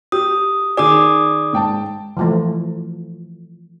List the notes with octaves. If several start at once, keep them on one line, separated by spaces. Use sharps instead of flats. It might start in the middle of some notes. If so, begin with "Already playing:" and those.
G4 D#6
D#3 G#4 D5 D6 D#6
G#2 G5 A5
E3 F3 A3